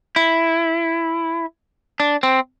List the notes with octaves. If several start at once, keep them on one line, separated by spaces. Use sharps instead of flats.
E4
D4
C4